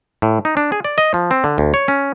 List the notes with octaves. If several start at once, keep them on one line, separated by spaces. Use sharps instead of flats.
A2
D#4
D4
G#4
D5
D#5
F3
C4
D3
D2
C#5
C#4